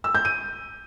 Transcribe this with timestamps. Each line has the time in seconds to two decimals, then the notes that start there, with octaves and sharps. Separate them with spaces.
0.04 E6
0.15 G6
0.25 D#7